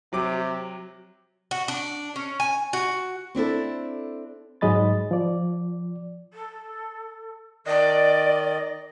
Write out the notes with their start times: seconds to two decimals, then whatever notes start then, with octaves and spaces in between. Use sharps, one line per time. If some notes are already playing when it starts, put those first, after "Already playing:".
0.13 C3 F#3 D6
1.51 F#4
1.68 D4
2.16 C#4
2.40 G#5
2.73 F#4
3.35 C4 D4 E4 A4
4.61 G#2 F#3 G#3 D#5 B5 A6
5.11 F3 D5
6.33 A4
7.67 D#3 D5 D#5